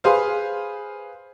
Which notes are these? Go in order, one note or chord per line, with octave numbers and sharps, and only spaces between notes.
G#4 B4 C5 F5